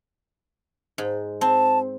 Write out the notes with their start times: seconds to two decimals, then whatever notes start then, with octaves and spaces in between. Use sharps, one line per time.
0.98 G#2
1.41 C4 A5